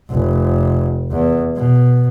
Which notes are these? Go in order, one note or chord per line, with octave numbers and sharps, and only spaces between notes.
F1
E2
B2